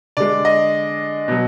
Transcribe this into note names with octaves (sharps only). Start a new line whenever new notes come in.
D3 G#3 D5
D#5
B2 F#3